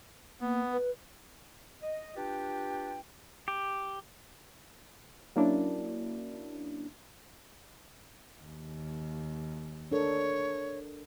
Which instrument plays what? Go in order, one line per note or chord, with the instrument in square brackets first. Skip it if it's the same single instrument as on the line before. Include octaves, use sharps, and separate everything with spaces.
[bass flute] A#3 [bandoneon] B3
[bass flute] B4
[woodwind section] D#5
D4 F4 G4 B4 G5
[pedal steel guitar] G4
[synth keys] F#3 A#3 C#4 D4 E4
[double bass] D#2
[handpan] D4 A4 A#4 [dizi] C#5